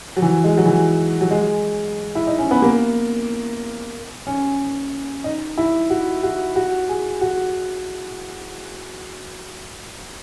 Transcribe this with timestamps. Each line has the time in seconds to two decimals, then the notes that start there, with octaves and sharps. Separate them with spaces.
0.17 F#3
0.22 E3
0.44 G#3
0.58 F#3
0.66 E3
1.21 F#3
1.31 G#3
2.15 E4
2.27 D#4
2.39 C#4
2.51 B3
2.62 A#3
4.27 C#4
5.24 D#4
5.58 E4
5.90 F#4
6.23 F#4
6.56 F#4
6.89 G#4
7.21 F#4